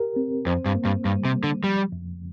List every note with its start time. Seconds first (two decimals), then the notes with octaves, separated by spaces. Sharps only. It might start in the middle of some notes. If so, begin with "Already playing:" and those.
Already playing: G4 A#4
0.16 C4
0.46 F2 C5
0.65 G2
0.75 A#3
0.85 G2
1.05 G2 G3
1.25 C3
1.34 A#3
1.43 D3
1.63 F3 G3
1.92 F2